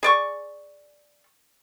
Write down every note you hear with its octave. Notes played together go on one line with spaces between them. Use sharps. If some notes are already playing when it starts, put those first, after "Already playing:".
G#4 D5 C#6